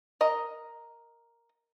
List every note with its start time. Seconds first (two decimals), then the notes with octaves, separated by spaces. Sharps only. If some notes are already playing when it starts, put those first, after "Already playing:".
0.21 A#4 D#5 A#5